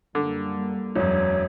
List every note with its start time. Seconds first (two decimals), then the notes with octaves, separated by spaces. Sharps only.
0.15 F#2 D3 G3 A#3
0.95 E1 F#2 C#5